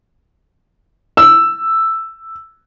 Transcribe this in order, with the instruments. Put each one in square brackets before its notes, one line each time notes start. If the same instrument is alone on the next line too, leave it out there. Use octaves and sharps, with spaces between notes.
[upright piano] E6